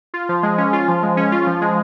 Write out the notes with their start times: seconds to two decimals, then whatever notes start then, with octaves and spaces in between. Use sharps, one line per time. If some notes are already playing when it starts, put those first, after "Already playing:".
0.14 F4
0.29 F3
0.43 G#3
0.58 C#4
0.73 F4
0.88 F3
1.03 G#3
1.17 C#4
1.32 F4
1.47 F3
1.61 G#3